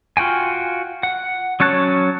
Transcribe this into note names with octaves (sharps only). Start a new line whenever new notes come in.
F4 F#4 G5 G#5
F#5
F#3 C#4 C#5 A5 F#6